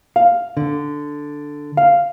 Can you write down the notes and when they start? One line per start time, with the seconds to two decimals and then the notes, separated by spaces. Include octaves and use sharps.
0.16 F5
0.57 D3
1.77 F5